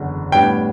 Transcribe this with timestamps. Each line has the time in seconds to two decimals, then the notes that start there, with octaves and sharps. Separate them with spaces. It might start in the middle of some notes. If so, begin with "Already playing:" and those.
Already playing: F#1 E2 D3
0.32 A2 G3 B3 D4 G5